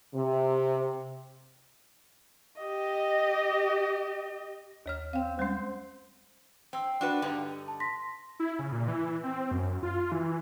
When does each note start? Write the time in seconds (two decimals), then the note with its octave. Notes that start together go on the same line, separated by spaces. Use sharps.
0.15 C3
2.60 G4 D#5
4.86 D#2 C#5 F6
5.13 C4 F5 G5
5.39 G3 G#3 C#4 C5
6.73 C4 G5 E6
7.01 D4 F#4 B4
7.22 G2 D3 D#4
7.68 A5
7.80 C6 A#6 B6
8.40 E4
8.59 C#3
8.72 A#2
8.88 E3
9.23 C4
9.51 F#2
9.83 F4
10.12 E3